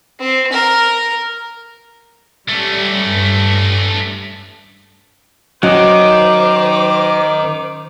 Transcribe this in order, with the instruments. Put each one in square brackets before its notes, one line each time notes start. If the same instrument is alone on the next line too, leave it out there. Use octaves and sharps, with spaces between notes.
[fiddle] C4
A#4
[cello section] G3 [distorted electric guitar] A3 C#4
[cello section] G2
[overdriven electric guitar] D#3 [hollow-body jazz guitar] F#3 [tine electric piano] C#4 D#5 [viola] C5 D6